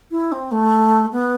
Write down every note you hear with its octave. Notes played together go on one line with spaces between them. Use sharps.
E4
C4
A3
B3